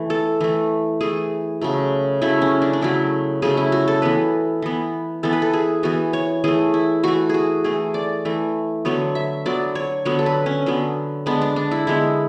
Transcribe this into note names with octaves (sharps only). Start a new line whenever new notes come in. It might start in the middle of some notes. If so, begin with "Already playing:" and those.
Already playing: E3 A3
A4
E3 A3
E3 A3 G#4
C#3 F#3 A3
C#3 F#3 A3 E4
C#4
D4
D4
C#3 F#3 A3 E4
C#3 F#3 A3 G#4
E4
F#4
A4
E3 B3 B4
E3 B3
E3 B3 A4
B4
A4
G#4
E3 B3 F#4
C#5
E3 A3 G#4
E4
E3 A3 F#4
F#4 G#4
E3 A3 G#4
D5
E3 A3
D3 F#3 B3 C#5
E5
D3 F#3 B3 D5
C#5
D3 F#3 B3 C#5
A4
B4
C#4
D3 F#3 B3
D3 G#3 B3 D4
D4
D4
E4
D3 G#3 B3 E4